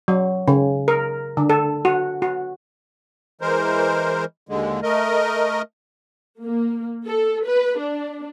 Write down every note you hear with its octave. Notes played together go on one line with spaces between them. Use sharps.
F#3
C#3
A#4
D3
A4
F#4
F#4
E3 G#3 A#4 C5
D#2 D3 G#3
A3 A#4 D#5
A#3
A4
B4
D4